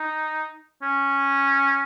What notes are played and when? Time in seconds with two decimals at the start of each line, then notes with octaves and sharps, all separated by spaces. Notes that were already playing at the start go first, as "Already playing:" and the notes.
Already playing: D#4
0.83 C#4